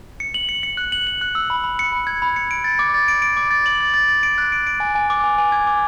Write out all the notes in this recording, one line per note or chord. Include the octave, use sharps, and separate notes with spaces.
C#7
F#7
C#7
C#7
F#6
F#7
F#7
F#6
E6
B5
B5
C#7
B5
G#6
B5
C#7
D7
A6
D6
A6
D7
D7
D6
A6
F#7
A6
A6
A6
D7
F#6
D7
D7
G#5
G#5
D6
G#5
G#5
G#6
D6